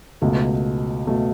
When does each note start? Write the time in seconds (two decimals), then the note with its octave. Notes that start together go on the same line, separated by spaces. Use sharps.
0.22 C#2 B2 A3
1.07 B2 A3